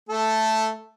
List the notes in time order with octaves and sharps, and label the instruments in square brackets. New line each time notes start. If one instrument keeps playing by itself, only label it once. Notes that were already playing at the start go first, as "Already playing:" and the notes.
[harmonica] A3 A4